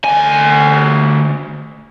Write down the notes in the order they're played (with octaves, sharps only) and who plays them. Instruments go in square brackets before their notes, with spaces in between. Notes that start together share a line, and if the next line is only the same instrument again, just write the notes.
[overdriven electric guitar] D2 G#5